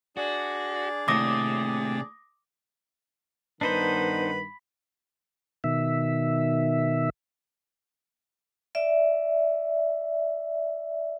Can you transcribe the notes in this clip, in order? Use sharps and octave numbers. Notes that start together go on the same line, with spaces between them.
D4 F#4 G#4 D5
D#2 A2 C3 D6 D#6 A#6
G2 D#3 B3 D4 D#4 B4 C5 B5
B2 D#3 E5
D5 E5